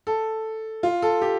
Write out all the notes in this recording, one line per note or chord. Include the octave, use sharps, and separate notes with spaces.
A4
F4
A4
G4